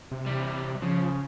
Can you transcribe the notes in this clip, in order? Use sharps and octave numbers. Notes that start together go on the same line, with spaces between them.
C3
E3 G3
C#3 F3